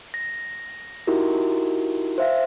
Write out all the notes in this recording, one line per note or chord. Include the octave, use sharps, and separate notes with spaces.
A#6
D#4 E4 F#4 G4 A#4
C5 E5 F5